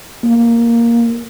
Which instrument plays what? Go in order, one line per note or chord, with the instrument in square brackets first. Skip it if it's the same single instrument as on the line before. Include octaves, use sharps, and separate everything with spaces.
[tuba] A#3